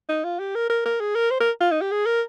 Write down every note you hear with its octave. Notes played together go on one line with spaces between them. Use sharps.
D#4
F4
G4
A#4
A#4
A#4
G#4
A#4
C5
A#4
F4
D#4
G4
G#4
A#4